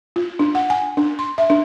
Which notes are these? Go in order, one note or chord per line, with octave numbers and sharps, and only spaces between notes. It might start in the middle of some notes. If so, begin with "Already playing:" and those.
F4
D4
F#5
G#5
D4
C6
E5
D4